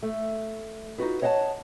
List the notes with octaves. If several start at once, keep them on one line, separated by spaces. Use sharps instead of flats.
A3
D#4 F4 F#4 B4
C#5 D#5 F#5 G5 A5